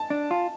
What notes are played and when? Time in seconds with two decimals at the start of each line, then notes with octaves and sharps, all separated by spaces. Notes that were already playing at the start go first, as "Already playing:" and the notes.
Already playing: A5
0.10 D4
0.31 F4